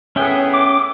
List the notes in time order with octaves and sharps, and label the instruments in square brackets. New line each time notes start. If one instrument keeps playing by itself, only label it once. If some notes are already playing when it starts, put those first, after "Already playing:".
[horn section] A2 B3 G#4 [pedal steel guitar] C#4 E5 G5
[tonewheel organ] D6